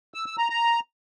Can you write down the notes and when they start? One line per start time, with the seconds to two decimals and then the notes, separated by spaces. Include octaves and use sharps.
0.14 E6
0.26 E6
0.38 A#5
0.50 A#5